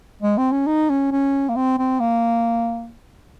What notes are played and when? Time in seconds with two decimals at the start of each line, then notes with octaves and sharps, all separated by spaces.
0.22 G#3
0.38 C4
0.52 C#4
0.67 D#4
0.90 C#4
1.11 C#4
1.49 A#3
1.56 C4
1.78 C4
2.00 A#3